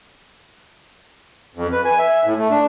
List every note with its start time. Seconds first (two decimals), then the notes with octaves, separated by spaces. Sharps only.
1.55 F2
1.72 B4
1.85 G#5
1.99 E5
2.12 E5
2.25 A2
2.38 A3
2.50 D4